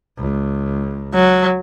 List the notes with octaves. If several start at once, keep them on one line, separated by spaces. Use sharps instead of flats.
C#2
F#3